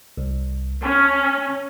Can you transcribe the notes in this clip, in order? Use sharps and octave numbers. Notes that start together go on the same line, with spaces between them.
C2
C#4 A5 C#6 F6